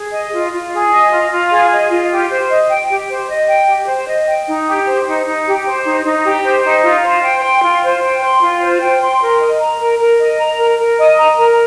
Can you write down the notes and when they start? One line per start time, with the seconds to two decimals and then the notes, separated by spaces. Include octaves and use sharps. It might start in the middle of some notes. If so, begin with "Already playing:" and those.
Already playing: G#4
0.12 D#5
0.33 F4
0.52 F4
0.72 G#4
0.92 D#5
1.11 F4
1.31 F4
1.50 G#4
1.71 D#5
1.90 F4
2.10 G4
2.30 C5
2.50 D#5
2.69 G5
2.89 G4
3.09 C5
3.29 D#5
3.48 G5
3.68 G4
3.88 C5
4.08 D#5
4.27 G5
4.46 D#4
4.67 G4
4.86 C5
5.06 D#4
5.25 D#4
5.46 G4
5.65 C5
5.85 D#4
6.05 D#4
6.24 G4
6.45 C5
6.64 D#4
6.83 F4
7.03 C5
7.23 G5
7.43 C6
7.62 F4
7.82 C5
8.02 G5
8.22 C6
8.41 F4
8.61 C5
8.80 G5
9.01 C6
9.21 A#4
9.40 D#5
9.60 A#5
9.79 A#4
9.99 A#4
10.19 D#5
10.39 A#5
10.58 A#4
10.79 A#4
10.98 D#5
11.18 A#5
11.37 A#4